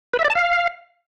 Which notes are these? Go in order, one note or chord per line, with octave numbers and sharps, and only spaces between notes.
B4
E5
D5
A5
F5